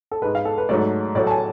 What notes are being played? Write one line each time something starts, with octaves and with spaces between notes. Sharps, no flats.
A4
G#2 G#3 B4
F5
A4
B4
G#2 F#3 A3 D5
A2 F#3 A3 D5
A5
G#5